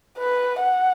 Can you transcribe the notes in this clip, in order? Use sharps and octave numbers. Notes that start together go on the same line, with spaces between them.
B4
F#5